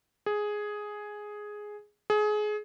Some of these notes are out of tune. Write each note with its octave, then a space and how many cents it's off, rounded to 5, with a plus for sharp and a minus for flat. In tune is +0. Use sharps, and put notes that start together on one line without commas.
G#4 +5
G#4 +25